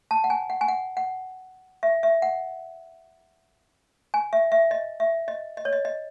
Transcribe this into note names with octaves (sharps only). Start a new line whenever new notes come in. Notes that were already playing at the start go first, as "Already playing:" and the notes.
A5
F#5
G#5
F#5
G#5
F#5
F#5
E5
E5
F#5
G#5
E5
E5
D#5
E5
D#5
D#5
C#5
D#5
D#5